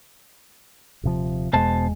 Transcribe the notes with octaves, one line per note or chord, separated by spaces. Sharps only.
D#1 C3 F3
E1 E2 B2 G#3 C5 A5